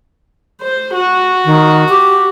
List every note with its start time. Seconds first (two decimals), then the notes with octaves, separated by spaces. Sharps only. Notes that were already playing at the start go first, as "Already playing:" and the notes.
0.61 C5
0.94 F#4
1.45 D#3
1.89 G4